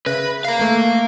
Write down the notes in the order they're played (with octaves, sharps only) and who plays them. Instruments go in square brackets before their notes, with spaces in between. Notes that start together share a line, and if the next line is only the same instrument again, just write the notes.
[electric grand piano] C#3 E5 A#6 [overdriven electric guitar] B4
[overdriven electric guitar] A#4 F5
[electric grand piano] A3 A#3